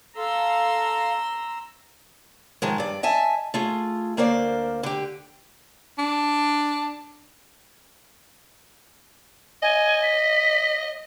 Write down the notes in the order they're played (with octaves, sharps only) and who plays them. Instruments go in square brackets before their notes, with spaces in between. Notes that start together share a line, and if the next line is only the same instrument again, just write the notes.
[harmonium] A4 F5 [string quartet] A#5 C6 E6
[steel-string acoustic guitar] G#2 D#3 F3 G#3
G2 D5
D#5 E5 G#5 A5
A3 F4 G#4
D2 A#3 A#4 C5 D5
D3 G4
[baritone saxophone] D4
[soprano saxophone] D#5 [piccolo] G#5
[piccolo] B6